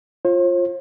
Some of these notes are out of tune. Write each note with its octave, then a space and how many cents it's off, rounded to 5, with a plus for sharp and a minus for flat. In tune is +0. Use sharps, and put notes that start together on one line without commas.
F4 +0 C5 +45